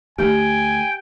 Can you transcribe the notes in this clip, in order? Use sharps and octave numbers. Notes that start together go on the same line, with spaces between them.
D2 A3 G4 G5 G#5